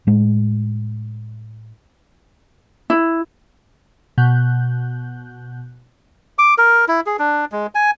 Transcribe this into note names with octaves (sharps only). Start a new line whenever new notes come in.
A2 G#3
E4
B2 F#6 G6
D6
A#4
E4
G#4
D4
G#3
G#5